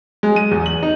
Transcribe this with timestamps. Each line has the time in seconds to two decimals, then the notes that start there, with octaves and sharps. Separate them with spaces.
0.23 G#3
0.36 D#7
0.51 E2
0.66 F#7
0.83 D#4